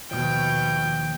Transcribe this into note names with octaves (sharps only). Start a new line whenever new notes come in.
D#2 G#2 B2 F3 G5